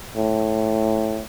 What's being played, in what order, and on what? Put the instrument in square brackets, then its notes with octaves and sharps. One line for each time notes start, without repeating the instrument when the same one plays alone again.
[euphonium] A2